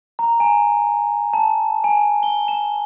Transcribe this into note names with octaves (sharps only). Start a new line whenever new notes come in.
A#5
G#5
A5
G#5
G7
E7